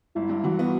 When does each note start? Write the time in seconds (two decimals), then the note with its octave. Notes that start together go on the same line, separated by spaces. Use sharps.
0.15 G1 E4
0.29 G2
0.44 E3 F#4
0.59 B3